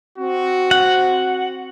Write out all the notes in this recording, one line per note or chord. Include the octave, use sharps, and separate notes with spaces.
C4 F#4
F#5